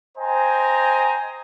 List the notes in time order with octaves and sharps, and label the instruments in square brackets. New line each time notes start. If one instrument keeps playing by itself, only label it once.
[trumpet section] C5 D#5 G5 G#5 A#5